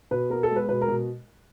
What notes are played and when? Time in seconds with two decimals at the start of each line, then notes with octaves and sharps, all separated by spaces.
0.11 B2 B4
0.30 B3 A#4
0.43 A4
0.50 G#3
0.56 B4
0.69 B2 B4
0.81 A#4
0.88 B2